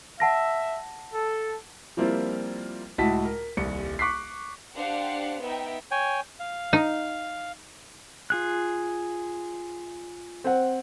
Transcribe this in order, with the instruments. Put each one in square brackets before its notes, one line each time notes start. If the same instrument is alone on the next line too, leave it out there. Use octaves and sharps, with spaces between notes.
[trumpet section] E5 [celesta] F#5 A5 A#6
[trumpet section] A4
[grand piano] F3 G3 A#3 C4 E4 F4
C#2 A2 E4 F#4 A5 B6
A#4
D#1 C2 C#7
C#6 D6 F#6 B6 C7
[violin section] D4 G4 C5 F5 F#5
B3 D#4 E5 G5
[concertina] C#5 G5 G#5
F5
[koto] D#4
[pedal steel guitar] F4 G#4 F#6
[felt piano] C4 F#5